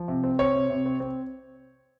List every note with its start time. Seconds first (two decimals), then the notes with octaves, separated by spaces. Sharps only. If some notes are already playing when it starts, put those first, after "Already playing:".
Already playing: F3
0.08 C3
0.24 C4
0.39 C4 C#5
0.54 C3
0.70 C3
0.86 C4
1.00 C4